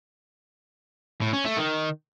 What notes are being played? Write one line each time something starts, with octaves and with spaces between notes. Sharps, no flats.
A2
C#4
A3
D#3